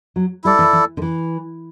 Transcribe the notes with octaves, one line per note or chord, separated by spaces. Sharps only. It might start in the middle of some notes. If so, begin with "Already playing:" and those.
F#3
G3 E4 A4 D5
E3
E3
D3
E3